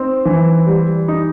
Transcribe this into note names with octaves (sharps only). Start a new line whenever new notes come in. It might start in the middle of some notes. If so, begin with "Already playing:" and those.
Already playing: C4 D#4
E3
G3
D#4